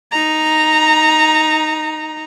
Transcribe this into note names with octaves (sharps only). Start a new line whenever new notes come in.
D#4 A#5